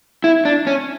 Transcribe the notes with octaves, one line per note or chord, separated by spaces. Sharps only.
E4
D4
C#4